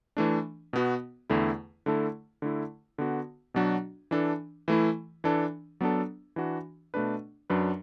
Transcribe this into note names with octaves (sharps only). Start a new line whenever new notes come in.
E3 A3 D4
B2 B3 F#4
E2 D3 A3 E4
D3 A3 E4 A4
D3 A3 E4
D3 B3 F#4
B2 F#3 D4 F#4
E3 D4 A4
E3 A3 E4
E3 D4 A4
F#3 B3 D4 A4
E3 D4 F#4
B2 A3 D4 B4
F#2 F#3 D4 B4